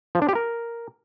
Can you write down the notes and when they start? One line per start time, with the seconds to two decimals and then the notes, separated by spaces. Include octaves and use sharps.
0.15 F3
0.22 D4
0.29 G4
0.35 A#4